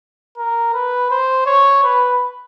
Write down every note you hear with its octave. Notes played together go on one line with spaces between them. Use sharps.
A#4
B4
C5
C#5
B4